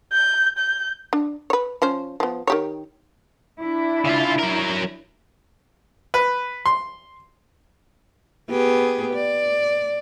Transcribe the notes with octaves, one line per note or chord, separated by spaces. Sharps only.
G6
G6
D4
B4 C#5
F3 C#4 C5
F3 B3
D#3 G4 C#5
D4 E4
C#3 F4
F#3 A#4
B4
C6
B3 G4 G#4
D5